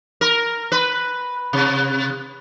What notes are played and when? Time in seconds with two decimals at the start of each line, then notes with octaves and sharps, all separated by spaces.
0.21 A#4
0.72 B4
1.53 C3